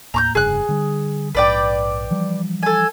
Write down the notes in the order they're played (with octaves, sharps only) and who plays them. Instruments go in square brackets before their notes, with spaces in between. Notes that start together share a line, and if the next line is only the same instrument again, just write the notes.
[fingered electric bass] D#2 A2 A#3 [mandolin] A#5 C#6 G6
[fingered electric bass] F1 G2 C#3 [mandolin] G#4 F#6
[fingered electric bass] D3 G3
[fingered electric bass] A#1 G#2 [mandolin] B4 D5 G5
[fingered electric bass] E3 F3 G3
[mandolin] A4 G#5